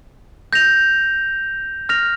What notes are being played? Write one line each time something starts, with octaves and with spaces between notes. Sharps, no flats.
G6 A#6 F7
F6 A#6 F7